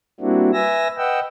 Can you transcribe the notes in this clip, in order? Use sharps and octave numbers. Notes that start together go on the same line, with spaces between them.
G3 A#3 C4 D4 E4 F#4
B4 E5 G#5 E6 A#6
B4 D#5 F#5 G5 E6